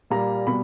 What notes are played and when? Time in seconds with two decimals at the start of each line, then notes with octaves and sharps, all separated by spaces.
0.10 A#2 G3 A#3 A#5
0.47 B2 G3 B5